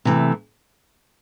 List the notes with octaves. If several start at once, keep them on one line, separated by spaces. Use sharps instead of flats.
C3 E3 A3